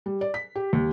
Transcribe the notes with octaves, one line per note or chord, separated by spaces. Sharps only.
G3
D5
B6
G4
D#2